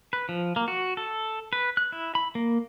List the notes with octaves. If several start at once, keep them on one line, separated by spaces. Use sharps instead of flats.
B4
F3
A#3
F#4
A4
B4
F#6
E4
B5
A#3